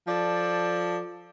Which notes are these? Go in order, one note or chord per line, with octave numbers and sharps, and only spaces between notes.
F3 A4 D5